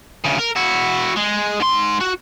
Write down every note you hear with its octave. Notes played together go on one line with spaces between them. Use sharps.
D2 C#3
A#4
E4 F#4
G#3
G#2 C6
F#4